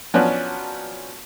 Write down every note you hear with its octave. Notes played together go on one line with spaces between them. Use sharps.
F3 F#3 B3 C#4 D4 F#4